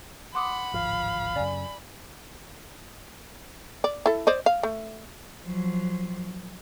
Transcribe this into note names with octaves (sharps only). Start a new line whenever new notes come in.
F#5 B5 C6 D6 D#6
D1 G#1 F3 F5
F#2 C#3 D5 G#5
D5
E4 A4
C5 D5 D#5
F5
A3
F3 F#3